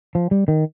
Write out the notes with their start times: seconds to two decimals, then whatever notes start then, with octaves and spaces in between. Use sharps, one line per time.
0.15 F3
0.31 G3
0.48 D#3